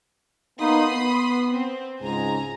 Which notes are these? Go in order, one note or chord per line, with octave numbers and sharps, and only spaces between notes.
A#3 B3 D#4 B5 C6 D#6
B3
C4
C#2 G#2 G#5 A#5